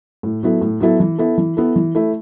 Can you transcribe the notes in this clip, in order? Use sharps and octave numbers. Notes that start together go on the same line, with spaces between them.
A2
F#3 B3 E4 A4
A2
F#3 B3 E4 A4
E3
B3 E4 A4
E3
B3 E4 A4
E3
A3 E4